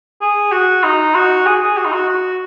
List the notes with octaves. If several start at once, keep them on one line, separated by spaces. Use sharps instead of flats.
G#4
F#4
D#4
F#4
G#4
G#4
F#4
D#4
F#4
F#4